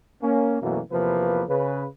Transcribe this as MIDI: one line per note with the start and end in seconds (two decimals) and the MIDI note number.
0.22 0.58 58
0.22 0.58 61
0.62 0.80 42
0.62 0.80 47
0.62 0.80 52
0.62 0.80 54
0.62 0.80 57
0.62 0.80 58
0.92 1.43 40
0.92 1.43 48
0.92 1.43 53
0.92 1.43 58
0.92 1.43 71
1.49 1.85 49
1.49 1.85 71